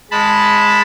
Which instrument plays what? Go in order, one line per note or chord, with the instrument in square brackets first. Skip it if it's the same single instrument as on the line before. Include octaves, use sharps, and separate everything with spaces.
[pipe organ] G#3 A5 B5